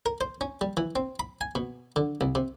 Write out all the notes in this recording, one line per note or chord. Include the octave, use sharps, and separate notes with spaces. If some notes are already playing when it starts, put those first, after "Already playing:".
A#4
C5
C#4
G3
E3
C4
B5
G#5
B2
D3
C2
C3